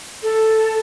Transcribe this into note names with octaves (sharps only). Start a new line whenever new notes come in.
A4